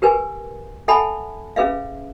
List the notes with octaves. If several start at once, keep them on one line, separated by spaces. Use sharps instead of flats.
G4 A#4 B4 G#5
A4 E5 F#5 G#5 A5 B5
C#4 G#4 B4 E5 F5